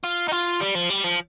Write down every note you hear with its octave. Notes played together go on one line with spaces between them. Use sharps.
F4
D#4
F4
G3
F3
G3
F3